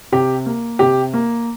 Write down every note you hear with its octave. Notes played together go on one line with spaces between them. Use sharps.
C3 G4
A#3
C3 G4
A#3